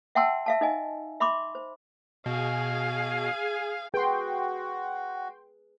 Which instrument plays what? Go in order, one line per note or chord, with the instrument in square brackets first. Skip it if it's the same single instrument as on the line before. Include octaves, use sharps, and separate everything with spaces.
[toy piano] E5 F#5 G5 A5 C6 E6
E5 F5 A5
D#4 D#5 G#5
E5 B5 C6 D6
C5
[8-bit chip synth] B2 [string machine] G#4 G#5 [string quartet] F5
[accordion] F#4 [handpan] G#4 B4 [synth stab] G5 C6